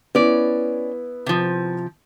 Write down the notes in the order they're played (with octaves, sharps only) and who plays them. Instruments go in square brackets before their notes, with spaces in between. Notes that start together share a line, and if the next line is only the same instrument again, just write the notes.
[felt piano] B3 E4 [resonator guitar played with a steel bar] C#4 D5
[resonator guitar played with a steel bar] C3 F3